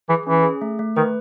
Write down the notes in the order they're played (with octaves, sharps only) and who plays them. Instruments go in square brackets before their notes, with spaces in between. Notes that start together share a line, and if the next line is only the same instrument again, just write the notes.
[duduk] E3 [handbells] G#4
[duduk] E3 [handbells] C#4
[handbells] G#4
A3
A3
[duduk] D#3 [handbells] B4